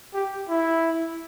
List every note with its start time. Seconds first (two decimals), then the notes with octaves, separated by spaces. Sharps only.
0.14 G4
0.49 E4